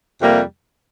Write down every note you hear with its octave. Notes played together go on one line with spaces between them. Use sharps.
F2 C3 G3 A#3